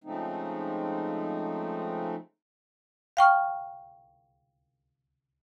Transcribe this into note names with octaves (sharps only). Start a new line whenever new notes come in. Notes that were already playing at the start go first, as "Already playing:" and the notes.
C#3 F3 G#3 A3 C4 D#4
F5 G5 C#6 F6